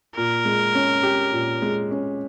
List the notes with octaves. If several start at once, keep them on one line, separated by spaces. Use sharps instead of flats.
A#2 A#4
G#3
C#4
G4
A#2
G#3
C#4